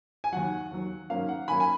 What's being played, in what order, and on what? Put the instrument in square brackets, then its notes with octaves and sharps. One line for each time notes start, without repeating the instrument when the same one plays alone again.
[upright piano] G#5
D#2 D#3 F#3 F#5
D#2 D#3 F#3
G#2 D#3 F#3 A#3 C#4 F5
F#5
G#2 D#3 F#3 A#3 C#4 G#5 B5
G#5 B5